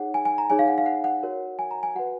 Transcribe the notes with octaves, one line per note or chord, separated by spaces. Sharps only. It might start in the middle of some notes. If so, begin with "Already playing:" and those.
Already playing: D#4 G#4 C#5 F#5
G#5
G#5
A#5
D#4 G#4 C#5 G#5
F5
F#5
F5
F#5
F#5
F#4 A#4 C#5
G#5
A#5
G#5
F#4 B4 F#5